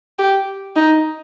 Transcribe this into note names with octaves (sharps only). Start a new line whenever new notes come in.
G4
D#4